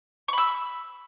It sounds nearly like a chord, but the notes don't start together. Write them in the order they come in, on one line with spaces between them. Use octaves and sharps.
C#6 B5 E6